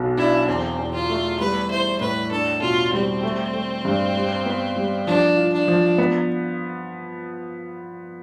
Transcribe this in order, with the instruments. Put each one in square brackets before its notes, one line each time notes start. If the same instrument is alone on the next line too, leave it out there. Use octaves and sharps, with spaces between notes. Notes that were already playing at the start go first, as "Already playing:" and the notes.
Already playing: [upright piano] B1 B2
[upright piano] D4 [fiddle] E4
[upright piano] E2 [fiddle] C4
[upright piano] E2
[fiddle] F4
[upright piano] A3
[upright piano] G3 [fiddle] B4
[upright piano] E4 [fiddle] C5
[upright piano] A2 [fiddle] B4
[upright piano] D4 [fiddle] A4
[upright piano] B2 [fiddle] F4
[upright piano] G3 [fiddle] C4
[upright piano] A3
A3
G2
G3
B3
G3
[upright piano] F3 [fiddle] D4
[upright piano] F4
[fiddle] D4
[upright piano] F3
B3